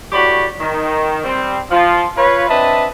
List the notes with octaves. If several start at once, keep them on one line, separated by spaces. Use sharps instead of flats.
A2 F#4 G4 C#5 D5 B5
D#3
G3 C4
F3 F4
F4 B4 C#5
C4 D4 B4 D#5 E5 A5